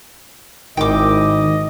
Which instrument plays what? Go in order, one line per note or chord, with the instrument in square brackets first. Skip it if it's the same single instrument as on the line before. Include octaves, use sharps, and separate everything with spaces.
[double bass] G#1 E4 [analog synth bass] D#3 [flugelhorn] D#5 [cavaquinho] G5 D6